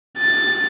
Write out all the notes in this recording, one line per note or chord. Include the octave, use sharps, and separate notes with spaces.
A6